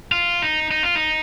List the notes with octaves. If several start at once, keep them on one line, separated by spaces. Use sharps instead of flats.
F4
D#4
D#4
F4
D#4